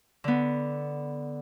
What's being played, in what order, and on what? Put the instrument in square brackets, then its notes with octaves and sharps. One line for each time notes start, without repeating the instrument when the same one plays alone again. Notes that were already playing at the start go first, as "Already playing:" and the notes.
[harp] D3 B3